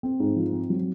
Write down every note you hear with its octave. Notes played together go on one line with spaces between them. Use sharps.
C4
G#2
F3
C4
F#3